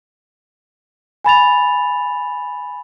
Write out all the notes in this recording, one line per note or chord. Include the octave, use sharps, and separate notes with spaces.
G#5 B5 A6 F7